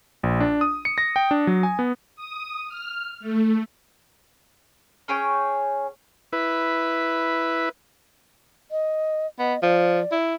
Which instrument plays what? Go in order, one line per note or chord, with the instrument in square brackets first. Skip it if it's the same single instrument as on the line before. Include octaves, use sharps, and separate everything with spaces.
[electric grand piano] A#1
D4
D#6
C#7
A#6
G5
D4
F#3
G#5
B3
[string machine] D#6
F6
A3
[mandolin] C#4 G#4 C#5 G5
[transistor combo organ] E4 B4
[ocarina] D#5
[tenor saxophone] B3 [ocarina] D#5
[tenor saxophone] F3 [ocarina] D5
[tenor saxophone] E4